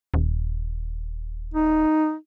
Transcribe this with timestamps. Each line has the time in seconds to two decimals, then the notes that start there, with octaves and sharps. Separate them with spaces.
0.14 D#1
1.54 D#4